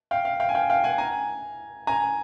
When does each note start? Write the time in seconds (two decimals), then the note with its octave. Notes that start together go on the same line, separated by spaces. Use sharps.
0.11 F5 G5
0.25 F5
0.40 F5 G5
0.49 G#5
0.54 F5 G5
0.70 F5 G5
0.84 F#5 G#5
0.98 G#5 A#5
1.87 G#5 A#5